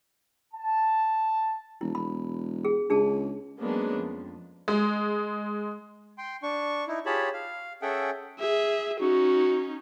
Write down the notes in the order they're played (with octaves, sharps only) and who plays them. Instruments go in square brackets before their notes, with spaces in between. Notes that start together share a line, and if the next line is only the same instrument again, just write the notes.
[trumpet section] A5
[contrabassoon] E1 [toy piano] E4
[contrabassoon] E1 [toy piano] B5
[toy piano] G#4
[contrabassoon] C#2 [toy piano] D4 G#4 A5
[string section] F#3 G#3 A#3 B3 C#4 D4
F2
[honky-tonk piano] G#3
[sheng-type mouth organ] G5 C6
D4 C#6
D#4 E4
F4 G4 G#4 C#5 A5 B5
F5
C#4 G#4 A4 E5 F#5 G5
[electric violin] G#4 E5
[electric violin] C#4 D#4 [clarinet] F#4